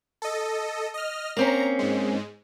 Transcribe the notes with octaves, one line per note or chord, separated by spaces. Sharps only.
A4 D#5
D#5 F6
A#3 C4 C#4 A#5
G#2 G#3